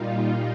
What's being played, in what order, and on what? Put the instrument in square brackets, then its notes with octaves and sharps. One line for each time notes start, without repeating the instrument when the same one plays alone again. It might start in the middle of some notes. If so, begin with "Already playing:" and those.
Already playing: [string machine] A#2 G3 D#4 F4